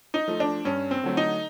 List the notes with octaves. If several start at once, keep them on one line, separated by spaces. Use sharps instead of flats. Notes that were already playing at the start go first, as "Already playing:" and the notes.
D#4
F3 A3
D4
G2 C#4
C4
D3 F#3 A3
D#4